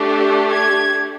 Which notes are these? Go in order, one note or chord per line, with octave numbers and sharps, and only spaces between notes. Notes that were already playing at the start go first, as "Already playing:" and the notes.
Already playing: A3 D4 G4
G#6